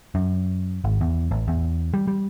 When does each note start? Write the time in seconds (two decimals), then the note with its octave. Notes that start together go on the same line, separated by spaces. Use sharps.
0.15 F#2
0.84 G#1
1.01 E2
1.31 A1
1.48 E2
1.94 G3
2.08 G3